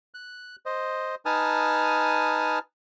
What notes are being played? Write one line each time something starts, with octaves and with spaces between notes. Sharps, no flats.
F#6
C5 D#5
D#4 B4 G#5 A5 D#6 F6